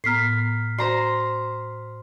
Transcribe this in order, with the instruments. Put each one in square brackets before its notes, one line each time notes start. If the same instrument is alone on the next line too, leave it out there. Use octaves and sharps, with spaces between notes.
[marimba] A2 B3 A#5 [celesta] F6 B6 C7
[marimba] F#4 D5 [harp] C5 A#5 C6